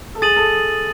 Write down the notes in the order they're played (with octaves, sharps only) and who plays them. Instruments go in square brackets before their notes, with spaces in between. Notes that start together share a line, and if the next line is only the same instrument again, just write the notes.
[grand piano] A4
[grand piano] G#4 [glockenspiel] D#6 A6 D#7 F#7
[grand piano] A4